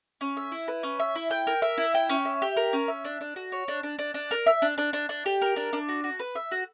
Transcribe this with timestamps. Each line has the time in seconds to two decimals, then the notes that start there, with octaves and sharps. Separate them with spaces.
0.21 C#4
0.37 E5
0.52 E4
0.68 B4
0.83 C#4
1.00 E5
1.16 E4
1.31 G5
1.47 A#4
1.62 E5
1.78 E4
1.95 G5
2.09 C#4
2.25 E5
2.42 G4
2.57 A#4
2.73 C#4
2.88 E5
3.05 D4
3.21 D4
3.36 F#4
3.52 C#5
3.68 D4
3.83 D4
3.99 D4
4.14 D4
4.31 A#4
4.46 E5
4.62 D4
4.78 D4
4.93 D4
5.09 D4
5.26 G4
5.42 A#4
5.56 D4
5.73 D4
5.89 F#4
6.04 F#4
6.19 B4
6.35 E5
6.51 F#4